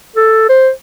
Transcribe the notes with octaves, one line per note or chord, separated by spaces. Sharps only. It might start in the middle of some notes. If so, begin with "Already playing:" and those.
A4
C5